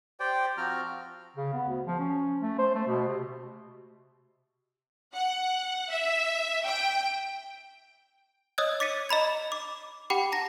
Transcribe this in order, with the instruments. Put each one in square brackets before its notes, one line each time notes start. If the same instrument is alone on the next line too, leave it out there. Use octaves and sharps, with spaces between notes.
[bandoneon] G4 C5 D5 G5
F3 C4 F#4 A#5 F6
[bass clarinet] C#3
B3
D2
F3
C#4
A3
C5
A3
B2
C3
[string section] F#5
E5
G5
[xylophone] C#5 D#5 D#6 E6 F#6 G#6
D6 A6 B6 C#7 D#7
D#5 A#5 B5 G#6
D6
G4 F#5 G5 B5 D6
A5 A#5 A#6